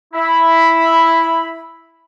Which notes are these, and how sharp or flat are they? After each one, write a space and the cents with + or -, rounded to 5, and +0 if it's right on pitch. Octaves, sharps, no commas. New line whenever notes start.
E4 +0 E5 +0 B5 +0